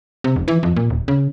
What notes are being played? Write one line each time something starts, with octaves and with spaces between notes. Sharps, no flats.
C3
F1
E3
F2
A#2
D#1
C#3